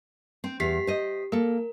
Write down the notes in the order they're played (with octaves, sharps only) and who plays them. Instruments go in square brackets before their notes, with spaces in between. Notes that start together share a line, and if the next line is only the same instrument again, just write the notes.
[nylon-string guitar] C4
[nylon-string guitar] E2 [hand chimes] G4 B6 C7
[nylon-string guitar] C5 D#5
[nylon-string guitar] A#3 A4 [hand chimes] A#4